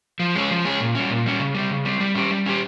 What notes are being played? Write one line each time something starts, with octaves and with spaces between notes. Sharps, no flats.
F3
G#3 C#4 G#4
F3
G#3 C#4 G#4
A#2
G3 C#4
A#2
G3 C#4
C#3
G3 C4
C#3
G3 C4
G3
C#4 G4
G3
C#4 G4